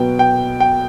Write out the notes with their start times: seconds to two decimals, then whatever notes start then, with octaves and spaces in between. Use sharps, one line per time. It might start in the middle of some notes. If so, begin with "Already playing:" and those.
Already playing: B2 F#3 B3 G5
0.19 G5
0.60 G5